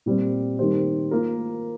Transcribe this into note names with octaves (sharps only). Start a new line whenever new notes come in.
A#2 G3 C4
D#3 G3 A#3 G4 C5
A#3 F4 A#4